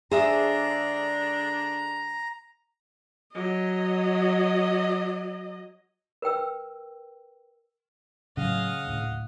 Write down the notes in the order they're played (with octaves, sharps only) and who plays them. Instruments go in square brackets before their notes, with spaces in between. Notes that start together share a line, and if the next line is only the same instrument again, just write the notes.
[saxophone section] D3 G#3 D4 [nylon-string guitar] G#4 [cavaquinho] C5 E5 D#6 [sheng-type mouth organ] A#5
[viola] F#3 D#5
[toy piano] A#4 B4 G5 E6
[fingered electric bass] A2 F#3 [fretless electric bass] C#3 [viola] D#5 F5 [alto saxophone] F#5
[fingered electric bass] D#1 D2 A2